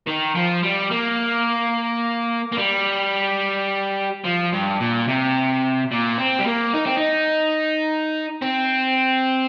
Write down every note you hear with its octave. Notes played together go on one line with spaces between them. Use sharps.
D#3
F3
G3
A#3
A#3
G3
F3
G2
A#2
C3
A#2
C4
G3
A#3
D#4
C4
D#4
C4